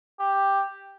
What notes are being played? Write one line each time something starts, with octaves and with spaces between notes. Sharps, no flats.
G4